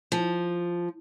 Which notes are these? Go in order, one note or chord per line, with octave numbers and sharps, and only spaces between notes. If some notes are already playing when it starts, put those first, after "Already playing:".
F3